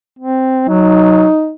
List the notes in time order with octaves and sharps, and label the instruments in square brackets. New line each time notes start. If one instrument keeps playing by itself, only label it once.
[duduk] C4
[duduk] F#3 [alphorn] D#4